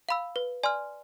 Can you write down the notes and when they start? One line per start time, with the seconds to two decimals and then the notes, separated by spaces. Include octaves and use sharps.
0.09 F5 B5 E6
0.36 B4
0.63 D5 G#5 C6 F6